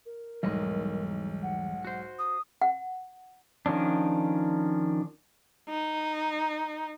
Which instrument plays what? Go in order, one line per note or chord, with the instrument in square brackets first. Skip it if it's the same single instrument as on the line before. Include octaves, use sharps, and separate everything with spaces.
[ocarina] A#4
[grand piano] B1 G#2 [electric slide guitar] E2 G3 D#5
[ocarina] F#5
[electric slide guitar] F#4 C5
[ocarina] D#6
[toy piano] F#5
[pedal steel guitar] D#3 F3 C#4 D4
[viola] D#4